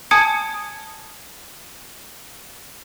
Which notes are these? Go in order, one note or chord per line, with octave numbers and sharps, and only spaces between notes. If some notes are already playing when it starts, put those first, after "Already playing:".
G#5 A5 D#6 G#6 C#7